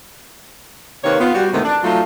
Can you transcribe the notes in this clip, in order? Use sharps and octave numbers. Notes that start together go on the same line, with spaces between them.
C3 D#3 A#3 C4 B4 C#5
B3 F4
G3 F#4
G#2 C3 D#3 E3 A3 B3
D4
F#3 A3 D#4 F4